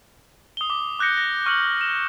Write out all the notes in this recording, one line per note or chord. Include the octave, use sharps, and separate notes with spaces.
D#6 G7
D6
D6 F#6 G6 A#6 C#7
A#6
C#6 F6 F#6 C#7 F#7
E7